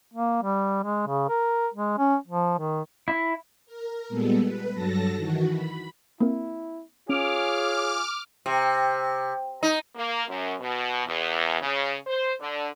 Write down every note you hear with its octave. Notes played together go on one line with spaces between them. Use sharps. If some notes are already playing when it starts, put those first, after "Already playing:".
A#3
G3
G#3
C#3
A#4
G#3
C#4
F3
D#3
E4
A#4
A#2 G3 G#3 B3 A4
B4
G2 F#3 A4 A5 A#6
D#3 E3 F#4
B5
A#3 C4 E4 A#4
C#4 F4 G#4 C#5 D6 F6
C3
D#4
A#3
F#2
B2
E2
C#3
C5
D3